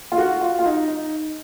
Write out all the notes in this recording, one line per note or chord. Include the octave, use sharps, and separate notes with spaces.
F4
F#4
F4
F4
D#4
D#4